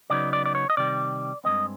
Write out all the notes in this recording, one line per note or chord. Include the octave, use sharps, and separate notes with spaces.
C#3 F#3 B3 D#4 D5
D5
D5
C#5
D#5
C3 D#3 G3 D5
G2 D#3 G#3 C4 D#5